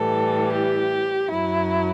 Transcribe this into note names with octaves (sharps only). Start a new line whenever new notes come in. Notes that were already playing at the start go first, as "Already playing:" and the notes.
Already playing: A2 E3 G3 A4
G4
F#2 F#3 E4